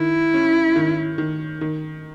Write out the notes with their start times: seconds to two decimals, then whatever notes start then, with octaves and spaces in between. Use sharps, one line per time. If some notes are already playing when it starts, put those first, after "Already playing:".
Already playing: D#3 E4
0.34 C#4
0.76 D#3
1.18 D#3
1.61 D#3